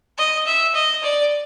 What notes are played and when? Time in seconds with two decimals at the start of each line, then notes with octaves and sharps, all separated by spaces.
0.18 D#5
0.46 E5
0.74 D#5
1.03 D5